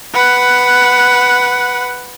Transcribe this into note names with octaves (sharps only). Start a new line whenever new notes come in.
B4 F#5